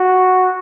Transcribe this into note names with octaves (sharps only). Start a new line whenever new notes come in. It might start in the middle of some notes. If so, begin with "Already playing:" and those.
Already playing: F#4